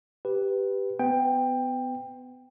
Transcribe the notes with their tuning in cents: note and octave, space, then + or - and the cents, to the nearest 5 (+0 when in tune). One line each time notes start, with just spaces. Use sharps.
G4 +0 B4 +0
B3 +30 G5 +15